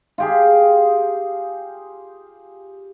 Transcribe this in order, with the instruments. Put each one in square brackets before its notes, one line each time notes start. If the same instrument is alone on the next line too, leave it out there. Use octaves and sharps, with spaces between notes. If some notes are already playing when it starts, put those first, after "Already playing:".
[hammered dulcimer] F4 G4 G#4